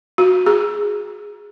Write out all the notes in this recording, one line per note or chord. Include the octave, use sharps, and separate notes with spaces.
F#4
G#4